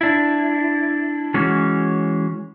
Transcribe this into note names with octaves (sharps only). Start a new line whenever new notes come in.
D4 E4
E3 G#3 C#4 F#4